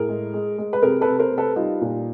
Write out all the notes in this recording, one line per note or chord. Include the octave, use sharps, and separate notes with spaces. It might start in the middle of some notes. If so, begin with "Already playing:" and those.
Already playing: A2 G#4 A#4
G#3
G#3
G#3
B4
C3 G#4 A#4
A4 B4
C3
A#4 C5
C3
A4 B4
G3 D#4 F4
A#2